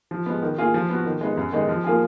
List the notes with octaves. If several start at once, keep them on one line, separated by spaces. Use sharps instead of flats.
F3
G#3 B3
D#3
A#3 F4 G#4
F3
B3 F#4
D#3
G#3 B3 D#4
F#2
D#3 G#3 B3 D#4
F3
A#3 F4 G#4